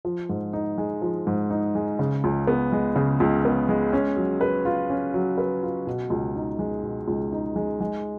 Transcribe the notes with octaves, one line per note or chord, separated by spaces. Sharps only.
F3
G#2
D#4
G#3
F3
G#2
D#4
G#3
C#3
C#2
B3
G#3
C#3
C#2
B3
G#3
C#4
F#3
B4
F4
C#4
F#3
B4
F4
B2
C#2
D#4
G#3
B2
C#2
D#4
G#3
G#3